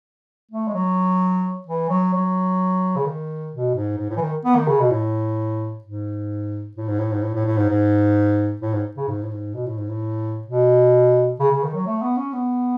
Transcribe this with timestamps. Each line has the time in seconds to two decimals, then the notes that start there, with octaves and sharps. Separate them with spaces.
0.51 A3
0.68 G#3
0.74 F#3
1.67 E3
1.89 F#3
2.13 F#3
2.96 C#3
3.06 D#3
3.52 B2
3.75 G#2
3.98 G#2
4.10 A2
4.17 E3
4.21 D#3
4.45 B3
4.56 D#3
4.68 C#3
4.80 B2
4.91 A2
5.84 G#2
6.76 A2
6.88 G#2
6.99 A2
7.12 G#2
7.23 A2
7.35 A2
7.46 A2
7.57 G#2
7.69 G#2
8.61 A2
8.73 G#2
8.96 C#3
9.08 G#2
9.23 A2
9.31 G#2
9.54 B2
9.66 A2
9.78 G#2
9.89 A2
10.47 B2
11.40 C#3
11.51 C#3
11.63 D#3
11.75 F#3
11.86 A3
12.02 B3
12.17 C#4
12.33 B3